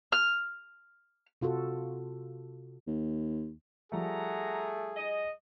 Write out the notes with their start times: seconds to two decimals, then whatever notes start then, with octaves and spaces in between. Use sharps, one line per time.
0.12 F6
1.41 C3 F4 F#4 A4
2.87 D#2
3.92 F3 G3 A3 G#4 F#5 A#5
4.96 D#5